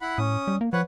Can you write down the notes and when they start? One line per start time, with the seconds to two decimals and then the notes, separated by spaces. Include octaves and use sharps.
0.01 E4 F#5 B5
0.18 A2 C#4 D#6
0.47 G3
0.61 A#3
0.73 F3 B4 C#5 F#5